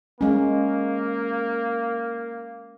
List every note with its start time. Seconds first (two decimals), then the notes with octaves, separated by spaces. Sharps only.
0.21 G#3 A#3 C#4